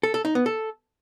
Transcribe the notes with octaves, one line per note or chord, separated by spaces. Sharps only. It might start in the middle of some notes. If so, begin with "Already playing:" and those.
A4
A4
D#4
B3
A4